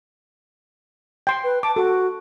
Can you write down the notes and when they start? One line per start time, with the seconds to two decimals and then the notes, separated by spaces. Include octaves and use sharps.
1.27 G5 C6
1.44 B4
1.63 A5 D6
1.76 F#4 A4